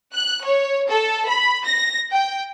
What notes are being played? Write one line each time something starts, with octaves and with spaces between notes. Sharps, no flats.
F#6
C#5
A4
B5
A#6
G5